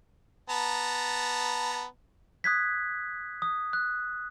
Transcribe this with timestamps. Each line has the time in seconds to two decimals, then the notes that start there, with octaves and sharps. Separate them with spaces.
0.49 B3 A5 A#5
2.44 D#6 F#6 G#6 B6
3.42 D#6
3.73 F#6